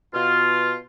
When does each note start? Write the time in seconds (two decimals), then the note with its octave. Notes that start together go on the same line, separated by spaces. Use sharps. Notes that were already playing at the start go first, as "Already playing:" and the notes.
0.14 B2 F4